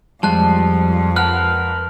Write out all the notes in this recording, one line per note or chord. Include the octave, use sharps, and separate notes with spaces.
F2 F3 G3 G#3 F4 A5 F#6
A#4 B4 F#5 A5 F6 F#6